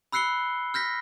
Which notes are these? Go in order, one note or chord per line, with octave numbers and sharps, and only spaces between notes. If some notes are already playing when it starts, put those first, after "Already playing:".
B5 E6 F#6 C7 C#7 G7
F6 G6 A#6 B6